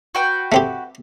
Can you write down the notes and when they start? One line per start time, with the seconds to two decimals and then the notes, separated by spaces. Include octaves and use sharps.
0.15 F#4 B4 G5
0.52 A3 C4 G4